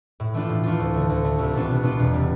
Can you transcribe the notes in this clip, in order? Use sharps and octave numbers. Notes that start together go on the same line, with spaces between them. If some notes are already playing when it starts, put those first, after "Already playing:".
A2
E3 A3 D4 F4
A2
E3 A3 D4 F4
D2
D3 A3
D2
D3 A3
C2
B2 B3 D4 F4
C2
B2 B3 D4 F4
E1
C3 G3